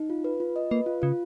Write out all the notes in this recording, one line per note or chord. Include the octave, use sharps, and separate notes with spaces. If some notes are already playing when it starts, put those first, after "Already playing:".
Already playing: D#4
F4
B4
F4
D#5
A#3 B4
F4
C#3 F4